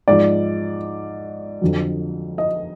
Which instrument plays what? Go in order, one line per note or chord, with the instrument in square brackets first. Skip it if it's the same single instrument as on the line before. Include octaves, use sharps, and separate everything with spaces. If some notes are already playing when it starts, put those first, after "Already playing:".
[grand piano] G#2 F3 D5
F2 D3 F#3
D#5